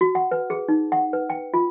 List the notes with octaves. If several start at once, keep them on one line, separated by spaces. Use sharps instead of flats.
F#4
F#5
B4
G#4
D#4
F#5
B4
G5
F4